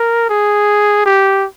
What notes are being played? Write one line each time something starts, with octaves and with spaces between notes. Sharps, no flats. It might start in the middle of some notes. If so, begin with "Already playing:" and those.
Already playing: A#4
G#4
G4